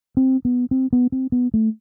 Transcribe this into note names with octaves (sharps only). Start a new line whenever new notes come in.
C4
B3
C4
B3
C4
B3
A3